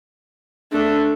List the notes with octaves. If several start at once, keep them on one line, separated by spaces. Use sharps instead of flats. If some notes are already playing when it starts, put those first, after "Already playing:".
A3 D4